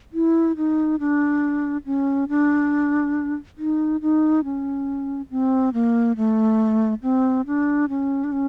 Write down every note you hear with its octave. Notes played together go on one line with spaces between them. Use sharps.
E4
D#4
D4
C#4
D4
D#4
D#4
C#4
C4
A#3
A3
C4
D4
C#4
D4
C#4